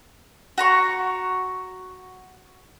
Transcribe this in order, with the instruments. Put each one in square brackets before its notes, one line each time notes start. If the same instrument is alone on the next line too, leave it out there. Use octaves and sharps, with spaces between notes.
[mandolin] F#4 A#5 C#6